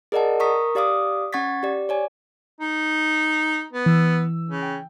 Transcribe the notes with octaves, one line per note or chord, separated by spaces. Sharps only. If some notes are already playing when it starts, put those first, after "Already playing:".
G#4 A#4 D5 D#5 F#5 A5
A#4 A#5 C#6 D#6 B6
G4 D5 F5 D6 D#6
C#4 F#5 C#6 G#6 A6 B6
G4 D5
C#5 D5 G#5
D#4
B3
E3 E6
C#3
G5